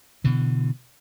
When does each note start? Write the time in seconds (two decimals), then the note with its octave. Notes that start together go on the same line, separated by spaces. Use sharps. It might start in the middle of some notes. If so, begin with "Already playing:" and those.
0.24 B2 D3 E3